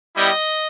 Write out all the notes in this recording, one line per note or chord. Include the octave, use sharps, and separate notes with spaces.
G3 B3 E4 G4 D#5